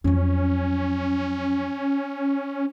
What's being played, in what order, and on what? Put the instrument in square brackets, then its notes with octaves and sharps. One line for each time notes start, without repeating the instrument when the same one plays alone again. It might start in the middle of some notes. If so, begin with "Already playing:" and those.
[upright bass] F2 F#3 [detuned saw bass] C#4